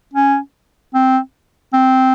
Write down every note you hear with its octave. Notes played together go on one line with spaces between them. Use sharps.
C#4
C4
C4